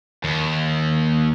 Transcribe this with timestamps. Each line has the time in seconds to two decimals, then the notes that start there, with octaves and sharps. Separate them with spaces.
0.24 D#2